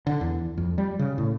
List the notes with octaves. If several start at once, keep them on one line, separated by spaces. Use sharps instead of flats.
D3
E2
F2
G3
C#3
A2